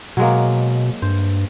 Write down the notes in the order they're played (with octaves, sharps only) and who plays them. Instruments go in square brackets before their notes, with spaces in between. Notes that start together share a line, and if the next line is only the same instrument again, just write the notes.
[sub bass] B2 [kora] F#3 G#3 A#3
[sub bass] G2 [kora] C5